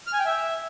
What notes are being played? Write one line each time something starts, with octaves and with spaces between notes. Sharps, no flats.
F6
G#5
G5
E5